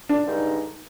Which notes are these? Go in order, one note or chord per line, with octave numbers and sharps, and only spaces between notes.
D4
G2 D3 G#3 D#4